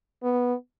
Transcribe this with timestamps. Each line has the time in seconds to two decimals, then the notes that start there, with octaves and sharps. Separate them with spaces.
0.23 B3